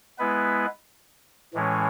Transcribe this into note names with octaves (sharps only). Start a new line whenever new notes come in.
G#3 B3 E4 B4
A2 E3 G#3 C#4